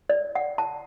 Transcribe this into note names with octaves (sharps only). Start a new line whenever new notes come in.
D5
F#5
A5